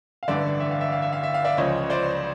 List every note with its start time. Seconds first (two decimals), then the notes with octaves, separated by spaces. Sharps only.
0.23 F5
0.28 A1 G2 D3 D5 E5
0.60 E5
0.71 F5
0.81 E5
0.92 F5
1.02 E5
1.13 F5
1.23 E5
1.34 F5
1.44 D5 E5
1.57 C#2 C#3 F3 C#5 D#5
1.90 C5 D5